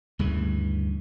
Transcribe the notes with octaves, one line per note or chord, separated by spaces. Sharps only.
D2 G2 C#3 E3